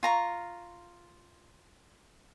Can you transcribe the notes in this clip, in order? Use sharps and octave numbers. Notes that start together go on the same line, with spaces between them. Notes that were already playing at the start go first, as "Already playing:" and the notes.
F4 A#5 C#6